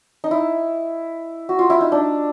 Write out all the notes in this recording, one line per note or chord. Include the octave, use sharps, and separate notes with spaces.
D#4
E4
F#4
F4
E4
D#4
D4